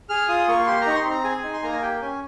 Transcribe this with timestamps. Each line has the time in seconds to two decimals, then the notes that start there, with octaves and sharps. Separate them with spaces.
0.09 G#4 F6
0.29 F4 D#6
0.48 A#3 C#6
0.66 G4 C6
0.81 A#5
0.87 D#4 C#6
0.95 C6
1.05 C4
1.11 A#5
1.24 G#4 G#5
1.43 D#4
1.53 C6
1.63 A#3 A#5
1.72 G#5
1.82 G4 G5
2.02 C#4 G#5